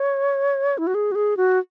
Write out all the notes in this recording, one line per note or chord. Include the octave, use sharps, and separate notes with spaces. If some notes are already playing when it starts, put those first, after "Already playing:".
Already playing: C#5
E4
F#4
G#4
F#4
G#4
F#4